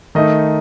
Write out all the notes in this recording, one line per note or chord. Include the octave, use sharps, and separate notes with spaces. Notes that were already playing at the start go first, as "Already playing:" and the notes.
D#3 A3 D#4 D#5